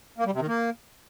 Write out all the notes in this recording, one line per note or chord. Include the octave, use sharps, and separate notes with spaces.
A#3
G3
C3
D#3
A#3